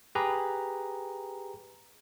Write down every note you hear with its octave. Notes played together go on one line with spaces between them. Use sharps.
G4 G#4 B4 A#5